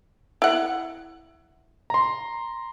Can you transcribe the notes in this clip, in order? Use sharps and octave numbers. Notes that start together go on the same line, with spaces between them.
E4 F#5
A#5 C6